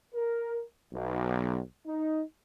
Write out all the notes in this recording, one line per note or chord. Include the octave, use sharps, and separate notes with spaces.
A#4
B1
D#4